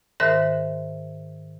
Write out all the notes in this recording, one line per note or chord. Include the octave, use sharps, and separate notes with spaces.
G#2 D#3 A#4 C5 E5 F#6